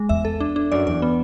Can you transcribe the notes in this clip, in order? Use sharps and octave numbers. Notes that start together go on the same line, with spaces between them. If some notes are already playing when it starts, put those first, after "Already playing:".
Already playing: G#3
E2 E5
A4
D4
D4
F#2 D5
E2 D5
B3